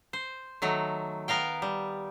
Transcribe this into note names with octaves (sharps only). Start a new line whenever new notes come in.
C5
D#3 F#3 A3
B3 A#4 F5 G5
G3